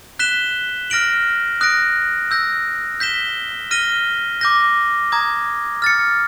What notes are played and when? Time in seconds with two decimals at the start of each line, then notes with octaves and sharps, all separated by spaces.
0.19 F#6 B6 E7 G7
0.90 F6 A#6 D7 F#7
1.61 D#6 F#6 A#6 D7
2.31 E6 G6 A#6
3.00 G6 B6 E7 G7
3.71 F6 A#6 D#7 G7
4.41 D6 G6 A#6
5.12 A#5 D#6 G#6
5.82 F6 A6 C#7